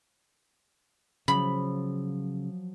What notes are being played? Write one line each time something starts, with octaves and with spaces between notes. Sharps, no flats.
C#3 F3 F#3 B5